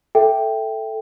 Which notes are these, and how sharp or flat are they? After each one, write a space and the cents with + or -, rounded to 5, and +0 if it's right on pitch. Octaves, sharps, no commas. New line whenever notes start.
A4 +0 E5 +0 G5 +0